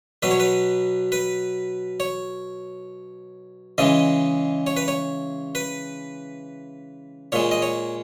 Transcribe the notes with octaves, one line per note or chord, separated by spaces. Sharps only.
B2 F#3 B4
C#5
B4
B4
C#5
C#3 E3 G#3 D#5
C#5
B4
C#5
B4
A#2 G#3 C#5
D#5
C#5